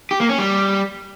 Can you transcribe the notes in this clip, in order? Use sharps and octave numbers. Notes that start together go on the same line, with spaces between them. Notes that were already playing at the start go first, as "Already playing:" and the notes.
G4
A#3
C#4
G3